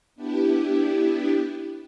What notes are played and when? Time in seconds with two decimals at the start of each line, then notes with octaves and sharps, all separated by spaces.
0.15 B3 D4 E4 G4